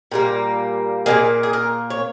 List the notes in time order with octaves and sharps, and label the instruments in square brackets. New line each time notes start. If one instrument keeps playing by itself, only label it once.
[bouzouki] A#2 G3 A#3
A#2 G3 A#3 G#4
G#4
A#4
C#5